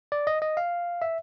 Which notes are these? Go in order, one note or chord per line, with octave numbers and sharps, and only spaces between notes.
D5
D#5
D#5
F5
E5